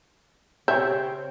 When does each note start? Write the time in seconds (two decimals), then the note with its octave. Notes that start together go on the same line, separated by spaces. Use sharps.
0.68 C#3 C4 G4 C#5 E5 G5 G6